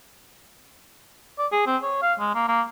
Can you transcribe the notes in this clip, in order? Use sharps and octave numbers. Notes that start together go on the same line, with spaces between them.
D5
G#4
C4
C#5
F5
G#3
A#3
A#3